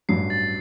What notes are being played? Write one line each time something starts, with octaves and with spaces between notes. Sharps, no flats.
A1 G2 F#3 C7
A6